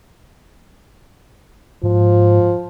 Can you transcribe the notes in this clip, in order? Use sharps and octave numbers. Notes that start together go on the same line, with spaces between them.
G#2 F3